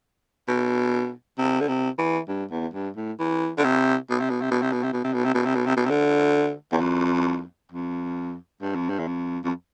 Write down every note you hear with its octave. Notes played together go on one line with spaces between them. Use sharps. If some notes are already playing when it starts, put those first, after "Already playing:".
B2
C3
D3
C3
E3
G2
E2
G2
A2
E3
D3
C3
B2
C3
B2
C3
B2
C3
B2
C3
B2
C3
B2
C3
B2
C3
B2
C3
B2
C3
D3
E2
F2
F2
G2
F2
G2
E2
F2
F2